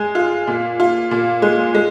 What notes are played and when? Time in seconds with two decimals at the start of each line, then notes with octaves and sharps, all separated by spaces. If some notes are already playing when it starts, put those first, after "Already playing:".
Already playing: G#3 G#4
0.15 F4
0.47 A#2
0.80 F4
1.11 A#2
1.42 G#3
1.74 G#3